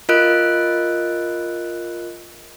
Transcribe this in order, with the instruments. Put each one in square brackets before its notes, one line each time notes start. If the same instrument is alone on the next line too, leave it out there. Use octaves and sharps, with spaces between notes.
[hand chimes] F4 A#4 D#5 F#6 D7